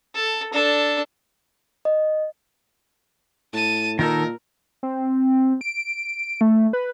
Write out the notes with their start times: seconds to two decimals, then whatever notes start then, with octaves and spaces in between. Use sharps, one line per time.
0.15 A4
0.53 D4 A4
1.85 D#5
3.53 A2 A5 D#7
3.99 A#2 D#3 D#4 A4 A#4
4.83 C4
5.61 D7
6.41 A3
6.73 B4